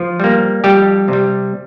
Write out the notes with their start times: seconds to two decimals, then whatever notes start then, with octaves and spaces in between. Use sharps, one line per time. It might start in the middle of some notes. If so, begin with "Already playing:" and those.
Already playing: F3 F4
0.20 G3 A#3
0.64 F2 G3 G4
1.08 C3
1.13 G3